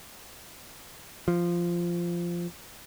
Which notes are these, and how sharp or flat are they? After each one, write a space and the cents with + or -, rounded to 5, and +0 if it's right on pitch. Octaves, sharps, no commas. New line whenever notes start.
F3 -10